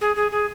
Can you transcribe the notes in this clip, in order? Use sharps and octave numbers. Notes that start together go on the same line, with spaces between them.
G#4
G#4
G#4